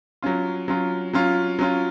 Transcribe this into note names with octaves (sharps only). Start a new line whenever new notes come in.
F#3 C#4 F4
F#3 C#4 F4
F#3 C#4 F4
F#3 C#4 F4